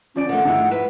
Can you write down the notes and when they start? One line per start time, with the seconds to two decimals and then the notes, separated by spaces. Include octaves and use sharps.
0.16 F3 C#4 D5 D7
0.29 D#3 A3 F#5
0.45 G#2 D#3 F3 G#3 E4
0.71 B4